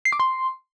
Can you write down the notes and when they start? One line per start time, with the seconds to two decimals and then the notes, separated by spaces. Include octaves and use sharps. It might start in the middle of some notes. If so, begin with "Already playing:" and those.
0.05 C7
0.12 D6
0.20 C6